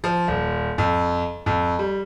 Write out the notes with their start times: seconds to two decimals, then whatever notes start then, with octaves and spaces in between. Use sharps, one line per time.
0.04 F3
0.28 D#1
0.78 F2
1.46 F2
1.79 G3